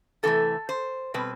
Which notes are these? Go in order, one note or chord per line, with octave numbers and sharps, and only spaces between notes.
C3 E3 A3 A4
C5
B2 G3 C4 B4